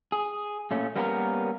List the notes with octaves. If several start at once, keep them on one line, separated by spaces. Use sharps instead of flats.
G#4
A#2 A3 C#4
G3 A#3 B3 C#4 G4 A#4